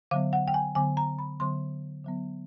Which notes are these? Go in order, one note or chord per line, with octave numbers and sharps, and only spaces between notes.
D3 F#3 B3 F5
F#5
G5
G#5
D3 F#3 B3 G#5
A#5
B5
D3 F#3 B3 C6
D3 F#3 B3